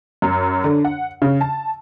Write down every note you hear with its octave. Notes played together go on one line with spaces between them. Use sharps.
F#2
D3
F#5
C#3
A5